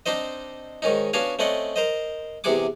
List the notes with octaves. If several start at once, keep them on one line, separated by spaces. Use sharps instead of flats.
C4 D4 D#4 C5 D#5
G#2 D#3 C#4 D#4
B3 C#4 D4 F#4 F5 G#5
A3 C4 C#4 D5 D#5 F#5
A#4 C5 D#5
E2 C3 G#4 F#5 G#5 D6